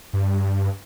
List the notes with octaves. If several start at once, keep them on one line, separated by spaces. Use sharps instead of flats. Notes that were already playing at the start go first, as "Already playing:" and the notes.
G2